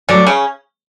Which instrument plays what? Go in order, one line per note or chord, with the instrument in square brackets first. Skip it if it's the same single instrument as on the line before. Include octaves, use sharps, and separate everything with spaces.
[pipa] D3 D4 [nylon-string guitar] F#3 A3
[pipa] C#3 C#4